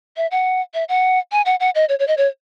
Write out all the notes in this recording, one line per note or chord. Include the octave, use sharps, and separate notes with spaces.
E5
F#5
E5
F#5
G#5
F#5
F#5
D#5
C#5
C#5
D#5
C#5